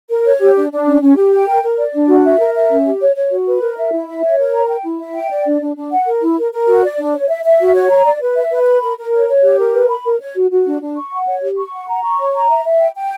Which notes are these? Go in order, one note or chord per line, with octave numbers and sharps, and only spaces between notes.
A#4
C#5
G4
D4
D4
C#4
C#4
G4
G5
A#4
A#4
D5
D4
F#4
E5
A#4
E5
C#4
G4
C#5
C#5
F#4
B4
A#4
E5
E4
E5
C#5
A#4
A#5
G5
E4
E5
G5
D5
D4
D4
D4
F#5
A#4
E4
A#4
A#4
F#4
D5
D4
C#5
E5
E5
F#4
C#5
A#5
D5
B4
E5
B4
B5
A#4
A#4
C#5
C#5
G4
A#4
B4
B5
A#4
C#5
F#4
F#4
D4
D4
C#6
F#5
C#5
G4
C#6
F#5
A#5
C#6
C#5
A#5
E5
E5
G5
G5